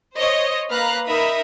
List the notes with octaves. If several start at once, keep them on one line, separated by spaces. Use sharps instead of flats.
C5 C#5 D#5
A#3 B4 F5 A#5 F6 F#6
D#4 A#4 E5 B5 D#6